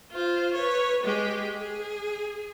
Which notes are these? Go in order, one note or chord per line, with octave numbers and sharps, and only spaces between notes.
F4 C5
B4 C#5
G#3 G4
G#4